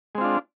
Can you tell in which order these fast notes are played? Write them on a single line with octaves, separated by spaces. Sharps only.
G#3 C4 F4 D4